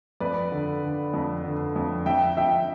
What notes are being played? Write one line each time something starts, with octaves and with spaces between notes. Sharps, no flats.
F2 B4 D5
D3
D3
F2
D3
F2
F2 E5 G5
F2 E5 G5